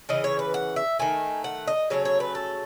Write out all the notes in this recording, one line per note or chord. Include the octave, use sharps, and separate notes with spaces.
C#3 E3 D#5
C#5
B4
F#5
E5
D#3 A3 G#5
F#5
D#5
C#3 F#3 A3 C#5
C#5
B4
A4